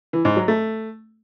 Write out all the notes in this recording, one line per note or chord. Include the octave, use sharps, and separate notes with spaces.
E3
G#2
F#3
A3